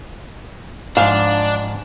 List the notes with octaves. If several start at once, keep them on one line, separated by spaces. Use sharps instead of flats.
G#2 F3 D4 F5